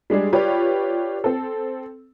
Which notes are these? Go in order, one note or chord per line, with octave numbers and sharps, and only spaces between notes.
G3 G#3 D4 G#4
F4 G4 B4 C#5 D5
C4 A4